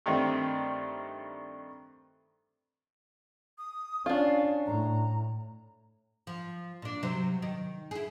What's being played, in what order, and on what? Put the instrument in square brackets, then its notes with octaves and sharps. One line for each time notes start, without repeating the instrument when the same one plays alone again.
[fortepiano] G2 D#3 A3 C4
[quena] D#6
[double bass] C#4 [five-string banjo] D4 F4 [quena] F5
[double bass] A2 [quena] A#5
[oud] F3
A#2 D4
C3 F#3 C5
D#3
E4 G#4